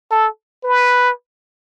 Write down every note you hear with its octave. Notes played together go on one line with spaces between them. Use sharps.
A4
B4